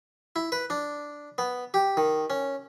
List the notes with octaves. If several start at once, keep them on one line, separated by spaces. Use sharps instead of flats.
E4
B4
D4
B3
G4
D#3
C#4